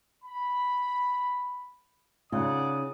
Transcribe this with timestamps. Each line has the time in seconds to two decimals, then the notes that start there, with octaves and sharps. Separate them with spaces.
0.23 B5
2.32 C#3 D#4 F4 D5 F#5 D#6